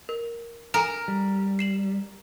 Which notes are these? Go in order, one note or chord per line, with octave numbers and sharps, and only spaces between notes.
A#4
A4 A#4 G#5 A#5
G3
C7 E7 F#7